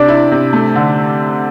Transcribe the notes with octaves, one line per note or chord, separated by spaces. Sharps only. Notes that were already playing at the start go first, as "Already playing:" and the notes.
Already playing: C3 D4 D5
E4
C3
A3
D3